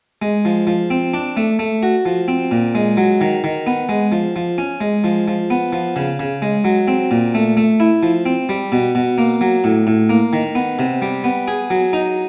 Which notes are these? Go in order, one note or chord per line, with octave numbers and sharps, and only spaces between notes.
G#3
F3
F3
C4
D4
A3
A3
F#4
F3
C4
A#2
G#3
F#3
D#3
D#3
B3
G#3
F3
F3
C#4
G#3
F3
F3
B3
F3
C#3
C#3
G#3
F#3
C4
A#2
A3
A3
E4
F3
C4
G3
B2
B2
A#3
F#3
A2
A2
A#3
D#3
B3
C3
G3
B3
G#4
F#3
D#4